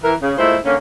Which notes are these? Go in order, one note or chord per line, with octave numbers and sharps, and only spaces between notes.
E3 A#4
C#3
A#2 G#3 A3 E4 C5
D3 A#3 C#4